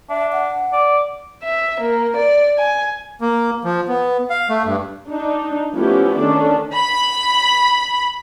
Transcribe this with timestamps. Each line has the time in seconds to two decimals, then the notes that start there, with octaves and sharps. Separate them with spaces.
0.10 D4 E5
0.32 F#5
0.73 D5
1.43 E5
1.80 A#3
2.16 D5
2.58 G#5
3.21 A#3
3.65 F3
3.88 B3
4.30 F5
4.50 A3
4.65 G2
5.08 D4 D#4
5.74 F3 A3 B3 C#4 E4 G4
6.16 D#3 C#4 D4 A4 D5
6.74 B5